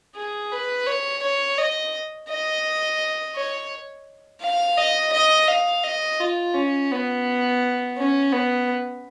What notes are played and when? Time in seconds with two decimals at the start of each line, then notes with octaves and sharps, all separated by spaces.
0.16 G#4
0.52 B4
0.87 C#5
1.23 C#5
1.58 D#5
2.30 D#5
3.36 C#5
4.41 F5
4.77 D#5
5.13 D#5
5.48 F5
5.84 D#5
6.19 F4
6.54 C#4
6.91 B3
7.97 C#4
8.32 B3